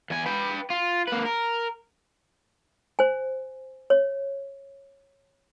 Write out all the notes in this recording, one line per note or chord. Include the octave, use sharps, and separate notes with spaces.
E2 G#5
B4 G5
F4
A#3 B4
A#4
C5 G#5
C#5